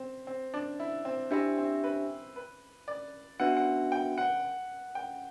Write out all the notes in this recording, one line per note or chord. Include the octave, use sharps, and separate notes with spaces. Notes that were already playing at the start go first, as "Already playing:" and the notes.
Already playing: C4
C4
D4
E4
C4
D4 E4 G4 C5 E5
C4
B4
B4
D5
B3 D4 F#4 B4 E5 F#5
F#5
G5
F#5
G5